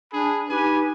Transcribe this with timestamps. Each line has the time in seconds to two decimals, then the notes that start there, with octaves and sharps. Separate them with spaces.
0.13 D4 G#4 B5
0.50 D#4 G4 B4 G#5